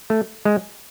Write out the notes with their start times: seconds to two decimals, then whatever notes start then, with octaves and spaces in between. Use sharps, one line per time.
0.10 A3
0.45 G#3